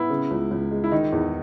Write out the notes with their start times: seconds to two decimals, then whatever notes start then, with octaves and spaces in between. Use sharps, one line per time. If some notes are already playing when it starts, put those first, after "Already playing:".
Already playing: B3 E4
0.10 C#3
0.31 C#2
0.51 C#2
0.71 G#3
0.84 E4
0.92 D#3 D#4
1.12 E2